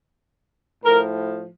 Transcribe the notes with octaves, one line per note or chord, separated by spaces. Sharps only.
A2 F3 A#4